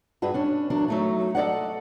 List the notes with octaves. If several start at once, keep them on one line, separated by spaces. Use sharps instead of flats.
G2 F#4 G#4 B4
C#4 D4
E2 F#3 D4 A#4
F#3 A3 D#4
A4 A#4 D5 D#5 F#5